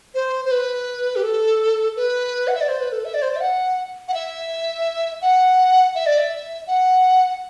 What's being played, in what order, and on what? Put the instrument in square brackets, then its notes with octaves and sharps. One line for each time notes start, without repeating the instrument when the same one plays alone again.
[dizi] C5
C5
B4
G4
A4
B4
F#5
E5
D5
C5
B4
A4
E5
D5
C5
D5
E5
F#5
F#5
E5
F#5
E5
D5
E5
F#5